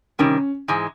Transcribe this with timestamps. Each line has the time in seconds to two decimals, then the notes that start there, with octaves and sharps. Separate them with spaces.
0.19 C3 D#3 G3 C#4
0.68 G#2 E3 G#3